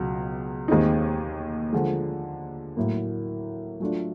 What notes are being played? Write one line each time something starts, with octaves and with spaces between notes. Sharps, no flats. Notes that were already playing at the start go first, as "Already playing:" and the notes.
Already playing: C#2 B2 F#3
D#2 D#3 G#3 C4 D#4
D3 F3 G#3
A2 F#3 A#3
F#3 A3 D4 F4